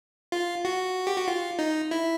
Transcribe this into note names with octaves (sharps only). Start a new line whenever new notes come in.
F4
F#4
G4
F#4
F4
D#4
E4